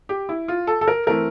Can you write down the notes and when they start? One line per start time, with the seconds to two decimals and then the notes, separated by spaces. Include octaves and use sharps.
0.09 G4
0.29 E4
0.48 F4
0.67 A4
0.81 A4
0.88 A#4
1.07 E3 A3 C4 A#4